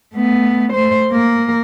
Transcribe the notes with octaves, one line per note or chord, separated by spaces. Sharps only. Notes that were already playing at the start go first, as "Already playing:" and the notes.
A3 B3
A3 C5
A#3 A#4